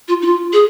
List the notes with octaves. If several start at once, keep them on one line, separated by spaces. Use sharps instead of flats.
F4
D#4
F4
G#4